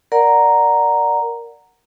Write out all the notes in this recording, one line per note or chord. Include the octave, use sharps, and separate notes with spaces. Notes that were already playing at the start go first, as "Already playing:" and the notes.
A#4 D5 F#5 A#5